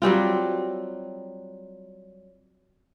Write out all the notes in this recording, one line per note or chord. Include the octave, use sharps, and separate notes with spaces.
F#3 G3 C4 F4